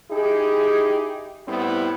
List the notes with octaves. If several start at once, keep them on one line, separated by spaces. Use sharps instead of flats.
D#4 E4 G4 G#4
A2 G3 B3 C4 E4